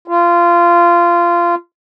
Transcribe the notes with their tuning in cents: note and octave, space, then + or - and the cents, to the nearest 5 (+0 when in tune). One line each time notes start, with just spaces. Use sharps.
F4 -20